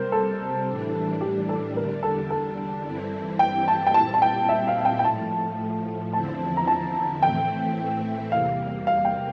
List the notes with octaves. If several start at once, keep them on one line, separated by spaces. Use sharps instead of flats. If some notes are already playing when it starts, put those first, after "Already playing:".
Already playing: C3 G3 C4 A#4 C5
A4
A2 E3 G3 D4
G4
A4
E2 D3 G3 D4 A#4
A4
A4
G2 E3 G3 C4 E4
G5
A5
G5
A#2 G3 C4 E4 A5
A5
G5
E5
F5
F5
G5
G5
A2 F3 A3 A5
E2 D3 F3 C4 E4 A5
A#5
A5
A2 E3 A3 C4 E4 G5
E2 C3 G3 A#3 F5
F5
G5